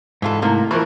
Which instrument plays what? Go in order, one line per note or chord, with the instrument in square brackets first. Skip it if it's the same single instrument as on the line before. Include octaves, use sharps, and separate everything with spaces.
[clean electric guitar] G#2 [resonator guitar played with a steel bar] E3 F4 A4
[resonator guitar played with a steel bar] C3 A#3 [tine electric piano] A3 E4
[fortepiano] E3 F3 A#4 [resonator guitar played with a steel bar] E4 [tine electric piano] C#6